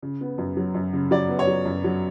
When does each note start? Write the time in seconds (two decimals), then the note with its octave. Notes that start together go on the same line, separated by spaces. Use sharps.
0.03 C#3
0.21 B3
0.38 F#2
0.57 F#3
0.74 F#2
0.93 C#3
1.11 F#3 D5
1.29 B3
1.39 C#5
1.47 F#3
1.65 F#2
1.84 F#3